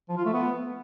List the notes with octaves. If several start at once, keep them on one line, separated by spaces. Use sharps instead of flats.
F3
F4
A3
B3